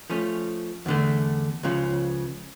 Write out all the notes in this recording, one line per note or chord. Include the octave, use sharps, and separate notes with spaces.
F3 A3 C#4
E2 D3 A3
C#2 C#3 F3